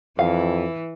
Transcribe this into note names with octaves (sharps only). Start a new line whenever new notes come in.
F2 E3 F5